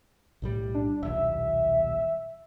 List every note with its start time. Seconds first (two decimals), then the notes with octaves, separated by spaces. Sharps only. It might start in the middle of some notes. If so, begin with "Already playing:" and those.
0.42 B1 A2 G3
0.74 D4
1.03 D#1 B1 E5